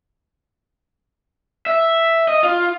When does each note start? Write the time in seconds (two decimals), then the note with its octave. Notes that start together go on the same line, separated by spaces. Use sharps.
1.66 E5
2.28 D#5
2.43 F4